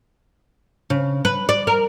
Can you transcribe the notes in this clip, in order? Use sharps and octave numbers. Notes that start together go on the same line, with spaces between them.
C#3
B4
D5
A#4